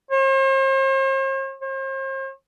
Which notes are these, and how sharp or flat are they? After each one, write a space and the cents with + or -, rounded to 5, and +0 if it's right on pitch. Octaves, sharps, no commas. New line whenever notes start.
C5 +45
C5 +40